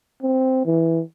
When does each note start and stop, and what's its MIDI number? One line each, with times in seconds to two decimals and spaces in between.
0.22 0.65 60
0.65 1.01 52